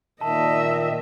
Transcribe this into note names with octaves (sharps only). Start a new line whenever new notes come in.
A#2 D#3 D#5 E5 A5